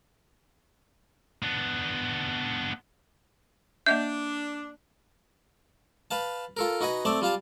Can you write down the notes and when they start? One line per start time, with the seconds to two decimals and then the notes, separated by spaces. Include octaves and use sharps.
1.42 B3 D4
3.86 A#3 D4 D#5 E5 G6
6.11 B4 F5 A5
6.57 F4 A4 A#4
6.81 D#4 F#4 B4 D#5 G#5
7.05 A3 C4 D5 A5
7.22 G3 F4 F5 A5